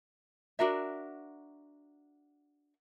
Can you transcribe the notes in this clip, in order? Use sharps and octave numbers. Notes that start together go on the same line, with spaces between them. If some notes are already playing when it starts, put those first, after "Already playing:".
D4 F#4 A#4 E5